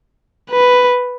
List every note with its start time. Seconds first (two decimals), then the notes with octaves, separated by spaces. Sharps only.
0.51 B4